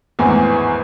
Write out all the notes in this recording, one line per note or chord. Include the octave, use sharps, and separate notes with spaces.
G#1 E2 A2 E3